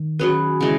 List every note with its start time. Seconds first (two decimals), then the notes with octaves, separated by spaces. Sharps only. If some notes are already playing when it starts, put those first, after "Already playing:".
Already playing: D#3
0.19 F#3 C#4 G#4 B4
0.61 C#3 E3 G#3